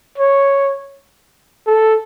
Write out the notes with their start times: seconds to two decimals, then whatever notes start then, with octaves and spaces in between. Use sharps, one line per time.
0.18 C#5
1.67 A4